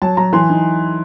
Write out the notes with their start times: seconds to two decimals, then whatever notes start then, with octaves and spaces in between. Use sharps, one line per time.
0.02 F#3 A5
0.17 F#3 A#5
0.33 E3 C6
0.50 D#4